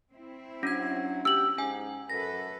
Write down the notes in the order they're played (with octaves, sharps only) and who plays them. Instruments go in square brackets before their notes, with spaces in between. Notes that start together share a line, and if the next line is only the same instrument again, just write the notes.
[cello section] C4 E4
[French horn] F#3 [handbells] C#4 D4 G#6 [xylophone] A#6
[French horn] G4 [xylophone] E6 F#7
[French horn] G#2 [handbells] C#4 G#5
[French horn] F#2 [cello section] A4 B4 [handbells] A#6